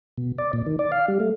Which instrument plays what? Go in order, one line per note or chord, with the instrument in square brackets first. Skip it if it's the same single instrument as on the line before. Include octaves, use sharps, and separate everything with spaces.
[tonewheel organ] B2
D5
A#2
D#3
D5
F5
G3
A3